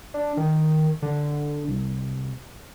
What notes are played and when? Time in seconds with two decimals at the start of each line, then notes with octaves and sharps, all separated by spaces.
0.14 D4
0.37 D#3
1.02 D3
1.68 C2